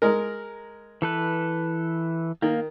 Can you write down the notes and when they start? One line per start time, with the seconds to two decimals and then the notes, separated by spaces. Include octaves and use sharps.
0.02 G#3 A#4
1.02 E3 A4 B4
2.42 D#3 A#3